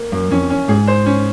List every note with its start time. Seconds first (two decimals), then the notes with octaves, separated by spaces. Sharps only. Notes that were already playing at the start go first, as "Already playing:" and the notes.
Already playing: A#3
0.12 F#2 A#3
0.31 F2 C#4
0.50 C#4
0.68 G#2 G#4
0.88 C5
1.06 C#4